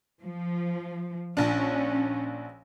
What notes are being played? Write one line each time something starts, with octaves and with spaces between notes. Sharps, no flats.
F3
A#1 C#4 D4